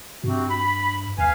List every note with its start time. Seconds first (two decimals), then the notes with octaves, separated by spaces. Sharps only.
0.24 G2 C3 C4 F#4
0.50 B5
1.18 D2 B4 F5 G#5